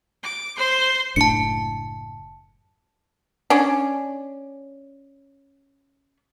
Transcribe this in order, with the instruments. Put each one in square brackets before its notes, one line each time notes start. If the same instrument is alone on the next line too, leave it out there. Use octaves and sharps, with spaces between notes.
[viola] D6
C5 C6
[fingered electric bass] F#1 A2 D4 [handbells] A5 C#7
[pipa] C#4 D4